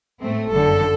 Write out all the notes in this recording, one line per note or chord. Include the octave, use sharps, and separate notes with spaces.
A2 A3 C4
G1 F#2 D3 A4